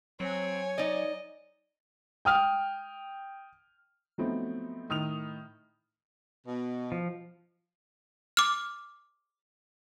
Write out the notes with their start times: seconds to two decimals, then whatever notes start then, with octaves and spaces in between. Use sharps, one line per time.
0.20 F#3 C4 C#5 G#5
0.78 D#4 D5 D#5
2.25 G5 D#6 F6
4.18 F3 F#3 A3 B3 C4 D#4
4.89 A2 D#3 D#6 F6 F7
6.47 B2
6.92 F3
8.37 D6 F6